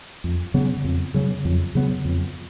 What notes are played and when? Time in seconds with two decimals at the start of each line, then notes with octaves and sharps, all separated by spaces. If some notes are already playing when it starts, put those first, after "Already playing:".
0.24 F2
0.54 C#3 F#3 B3
0.84 F2
1.14 C#3 F#3 B3
1.45 F2
1.75 C#3 F#3 B3
2.05 F2